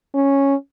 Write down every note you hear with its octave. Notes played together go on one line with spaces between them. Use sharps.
C#4